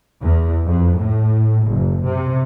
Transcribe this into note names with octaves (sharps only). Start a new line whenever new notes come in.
E2
F2
A2
F#1
C3